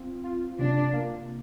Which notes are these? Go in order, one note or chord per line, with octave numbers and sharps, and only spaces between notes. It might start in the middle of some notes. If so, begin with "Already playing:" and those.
Already playing: C4 F4
F4
C3 D4
A#3